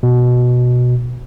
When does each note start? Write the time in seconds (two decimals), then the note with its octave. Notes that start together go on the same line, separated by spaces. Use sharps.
0.03 B2